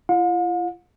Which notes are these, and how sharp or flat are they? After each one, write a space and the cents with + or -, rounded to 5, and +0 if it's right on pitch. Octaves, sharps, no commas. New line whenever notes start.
F4 -45 F5 +45